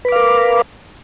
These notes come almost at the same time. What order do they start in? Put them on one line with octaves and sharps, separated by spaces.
B4 D6 F5 A#4